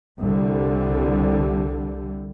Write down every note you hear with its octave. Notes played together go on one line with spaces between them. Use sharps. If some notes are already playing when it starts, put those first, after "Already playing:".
C2 D3 G3